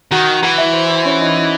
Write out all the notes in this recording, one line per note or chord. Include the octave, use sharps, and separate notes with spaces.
D#3 F#4 F#5
E3 F#4 F#5
E4 E5
C5
C5
C#4 C#5
D#4 D#5